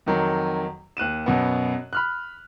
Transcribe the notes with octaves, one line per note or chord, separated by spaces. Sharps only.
F2 D#3 F#3
D#2 F#6 D#7 E7
F#2 B2 B3
B5 F6 F#6